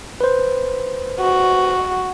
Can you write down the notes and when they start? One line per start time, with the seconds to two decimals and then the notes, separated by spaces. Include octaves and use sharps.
0.21 B4 C5
1.20 F#4